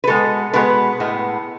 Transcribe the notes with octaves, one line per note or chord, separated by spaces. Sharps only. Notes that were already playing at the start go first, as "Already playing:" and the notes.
B4
B2 G#3 B3 A4
B2 G#3 B3 B4
A2 G#3 B3